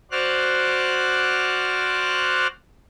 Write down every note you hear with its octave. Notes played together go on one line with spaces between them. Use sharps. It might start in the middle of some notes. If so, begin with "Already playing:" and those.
F#4 C5 D5 F6 F#6